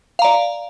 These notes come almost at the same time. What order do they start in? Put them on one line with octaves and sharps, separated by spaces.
F5 A#5 D5